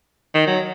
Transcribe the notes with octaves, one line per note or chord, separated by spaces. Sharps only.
D#3
F#3